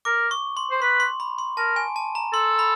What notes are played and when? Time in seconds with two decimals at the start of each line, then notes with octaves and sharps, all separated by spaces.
0.05 A#4 D6
0.31 C#6
0.57 C6
0.71 C5
0.82 B4 C6
1.00 C6
1.20 B5
1.38 C6
1.57 A#4 A5
1.76 G#5
1.96 A5
2.15 A#5
2.33 A4 C6
2.59 B5